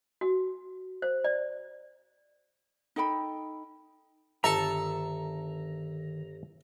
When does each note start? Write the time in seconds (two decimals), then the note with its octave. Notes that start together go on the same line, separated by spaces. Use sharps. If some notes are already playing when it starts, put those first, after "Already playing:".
0.21 F#4
1.02 C5
1.24 D5
2.96 D#4 A4 G5 B5
4.44 G1 D#3 A4 E5 A5 A#5